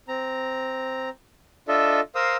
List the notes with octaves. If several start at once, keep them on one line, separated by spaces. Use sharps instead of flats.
C4 A#5
D4 F4 A4 D#5 E5
A#4 C5 F5 D#6 E6